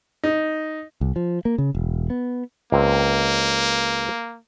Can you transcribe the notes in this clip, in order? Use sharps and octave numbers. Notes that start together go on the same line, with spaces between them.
D#4
C2
F3
A#3
C#3
E1
B3
C#2 A#3 C4